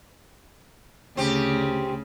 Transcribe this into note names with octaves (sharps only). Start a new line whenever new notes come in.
D2 C#3 C4 G4